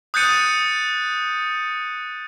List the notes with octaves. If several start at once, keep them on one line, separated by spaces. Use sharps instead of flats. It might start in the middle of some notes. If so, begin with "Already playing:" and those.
D#6 F#6 G6 A6 C#7 D#7